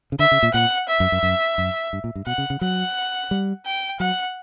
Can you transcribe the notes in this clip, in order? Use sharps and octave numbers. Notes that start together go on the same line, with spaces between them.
C#3
D3 E5
C#3
A#2
A#2 F#5
E5
F#2
F#2
F#2
F#2
G2
A#2
G2
B2 F#5
C#3
C#3
F#3 F#5
G3
G5
F#3 F#5